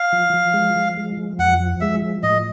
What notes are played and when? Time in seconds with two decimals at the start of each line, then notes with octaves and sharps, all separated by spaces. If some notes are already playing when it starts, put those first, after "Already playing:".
Already playing: F5
0.12 F3
0.34 F3
0.54 G#3
0.76 F3
0.97 G#3
1.17 F3
1.39 F2 F#5
1.60 F3
1.81 G#3 E5
2.02 F3
2.23 A2 D#5